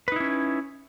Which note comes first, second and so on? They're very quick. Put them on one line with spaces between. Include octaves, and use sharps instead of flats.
B4 D#4 E4 C#4